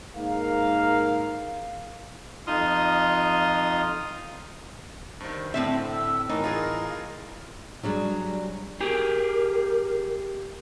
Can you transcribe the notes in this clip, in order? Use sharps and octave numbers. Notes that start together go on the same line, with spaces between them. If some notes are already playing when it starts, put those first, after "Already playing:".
G#2 A#3 A#4 F5
F2 D#4 F4 C6 D#6 F6
G2 D#3 C5
A2 D3 C4 E5
E6
A2 E3 D#4 A#4
F4 G#4 A#4 F5
F#3 G3 D4 G#4
G4 G#4 A#4